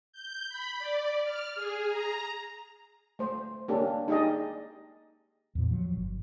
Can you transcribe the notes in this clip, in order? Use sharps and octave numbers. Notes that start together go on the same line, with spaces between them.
G6
B5
D5
F6
G#4
A#5
A3 C5
A#3 C#4 D4 G4 A4
D#4 G4 G#4 D5 D#5
E2 A#2
F3 F#3
G1